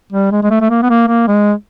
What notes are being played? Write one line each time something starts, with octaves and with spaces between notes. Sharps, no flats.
G3
G#3
G#3
A3
A3
A#3
B3
A#3
A#3
G#3